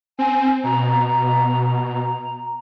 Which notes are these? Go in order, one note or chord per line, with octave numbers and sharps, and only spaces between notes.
C4 G#5
B2 A#5